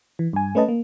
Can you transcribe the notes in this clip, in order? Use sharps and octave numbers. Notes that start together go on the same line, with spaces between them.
E3
G2 G#5
A3 C#4 B4 D#5 A5
A#3